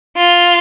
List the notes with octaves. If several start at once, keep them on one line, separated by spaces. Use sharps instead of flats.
F4